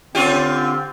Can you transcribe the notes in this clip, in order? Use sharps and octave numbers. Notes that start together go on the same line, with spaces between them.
D3 C4 C#4 F4 G4